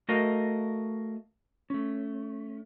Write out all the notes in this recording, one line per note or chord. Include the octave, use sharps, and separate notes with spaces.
A3 F#4 A4 A#4 D#5 F5
A3 C#4